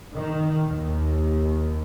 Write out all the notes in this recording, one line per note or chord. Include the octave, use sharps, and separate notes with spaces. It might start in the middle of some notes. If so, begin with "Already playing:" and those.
D#3
D#2